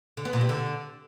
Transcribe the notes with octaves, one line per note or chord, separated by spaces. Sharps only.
D3
B3
A#2
G3
D3